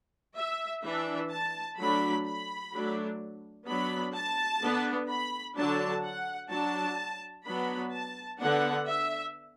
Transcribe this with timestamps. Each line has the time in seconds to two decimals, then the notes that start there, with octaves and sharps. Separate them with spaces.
0.36 E5
0.83 E3 D4 E5
1.31 A5
1.78 F#3 A3 D4 B5
2.25 B5
2.72 F#3 A3 D4
3.67 F#3 B3 D4 B5
4.14 A5
4.62 D3 B3 D4
5.09 B5
5.56 D3 F#3 D4 A5
6.03 F#5
6.50 F#3 D4 A5
7.45 F#3 B3 D4 B5
7.92 A5
8.40 D3 B3 D4 F#5
8.87 E5